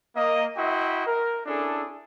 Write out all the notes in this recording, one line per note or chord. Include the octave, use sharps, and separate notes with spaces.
A#3 D#5
E4 F#4 D#5 E5 G5 C6
A#4
C#4 D4 E4 G#4 A4